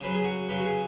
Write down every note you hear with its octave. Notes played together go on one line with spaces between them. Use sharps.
C#3 F#3 B4
G#4
F#4
C#3 F#3 B4
F#4
G#4